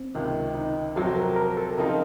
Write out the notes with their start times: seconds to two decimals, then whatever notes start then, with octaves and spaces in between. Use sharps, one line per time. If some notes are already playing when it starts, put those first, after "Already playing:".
Already playing: C4
0.15 C#2 C3 D#3
0.55 D#4
0.96 F2 C3 F#3 C4 F#4 A4
1.16 A#4
1.36 A#4
1.57 A4
1.77 C#3 F3 C4 D#4 A#4